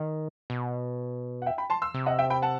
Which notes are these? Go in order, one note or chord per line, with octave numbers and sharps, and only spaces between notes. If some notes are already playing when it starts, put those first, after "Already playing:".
Already playing: D#3
B2
F#5
E5 G5
G5 B5
A5 C6
C6 E6
C3
D#5 F#5
E5 G5
G5 B5
F#5 A5